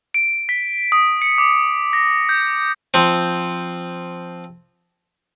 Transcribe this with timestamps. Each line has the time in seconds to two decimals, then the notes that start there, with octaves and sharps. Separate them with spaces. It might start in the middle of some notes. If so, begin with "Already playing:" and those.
0.14 D7
0.49 B6
0.92 D#6
1.22 C#7
1.38 D6
1.93 A#6
2.29 G6
2.94 F3 C4